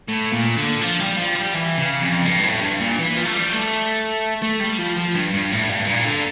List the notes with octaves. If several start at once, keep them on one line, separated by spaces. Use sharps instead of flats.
A2
A#2
D3
F3
G3
F3
G3
E3
C#3
F2
G2
A2
G2
A#2
E3
F3
A3
G3
A3
A3
G3
F3
F3
G2
G2
A2
G2
A#2
D3